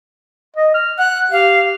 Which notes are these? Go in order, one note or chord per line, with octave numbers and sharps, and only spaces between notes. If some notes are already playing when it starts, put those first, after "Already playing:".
D#5
F6
F#5 F#6
G4 F5